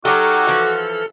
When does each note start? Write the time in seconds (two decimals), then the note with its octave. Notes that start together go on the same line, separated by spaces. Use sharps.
0.05 F#3 D#4 F#4 G4 A4 C#6 D6 F6
0.47 E3 F3